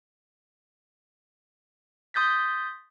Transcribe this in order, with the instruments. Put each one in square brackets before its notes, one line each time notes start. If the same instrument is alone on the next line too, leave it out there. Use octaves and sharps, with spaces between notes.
[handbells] C6 D#6 G6 A6 B6